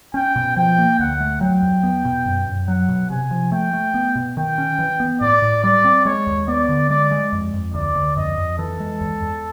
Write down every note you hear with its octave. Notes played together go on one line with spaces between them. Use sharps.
C#4 G5
B2
F3 G5
A#3
D2 F#5
A3
F#3 G5
E2
B3
B2
F#2
F#2
F#3 F#5
B2
C3 G#5
F3
A3 G5
A3
B3
B2
D#3 G5
C#4
E3
B3
A2 D5
A2
G3 D5
C4
G#3 C#5
D#2
B3 D5
D3
G#3 D5
G#3
F2
F2
D2 D5
D2
F2 D#5
F2
E3 A4
G#3
E2
E2